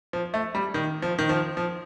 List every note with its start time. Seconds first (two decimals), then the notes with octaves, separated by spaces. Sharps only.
0.13 F3
0.34 A3
0.55 G3
0.74 D#3
1.02 F3
1.19 D#3
1.29 F3
1.57 F3